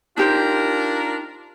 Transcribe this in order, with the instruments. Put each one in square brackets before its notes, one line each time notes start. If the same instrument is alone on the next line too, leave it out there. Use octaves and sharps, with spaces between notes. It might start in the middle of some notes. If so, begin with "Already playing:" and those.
[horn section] D4 F4 A#4 [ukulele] D#4 G4 C5